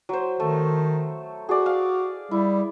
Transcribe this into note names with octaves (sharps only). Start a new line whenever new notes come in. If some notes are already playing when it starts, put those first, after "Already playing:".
F#3 C5
D#3 A3
F#4 G#4 D5
F5
G3 E4